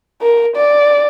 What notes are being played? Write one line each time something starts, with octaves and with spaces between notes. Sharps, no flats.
A#4
D5